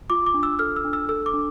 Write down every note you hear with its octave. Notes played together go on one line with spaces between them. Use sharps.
F4 D6
D6
D4
E6
A4 F6
E6
D4
E6
A4 E6
D6
D4